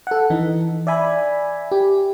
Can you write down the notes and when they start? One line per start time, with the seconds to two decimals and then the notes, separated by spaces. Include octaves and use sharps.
0.07 A4 F#5
0.30 E3 D#4
0.87 D5 E5 G#5 B5
1.72 G4